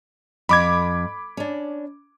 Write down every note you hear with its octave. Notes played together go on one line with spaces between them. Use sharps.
F2 B5 D6 G#6
C#4 D4